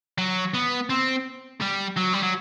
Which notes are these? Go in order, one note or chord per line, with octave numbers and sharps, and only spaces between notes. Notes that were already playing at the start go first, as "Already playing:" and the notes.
F#3
B3
C4
G3
F#3
G3
F#3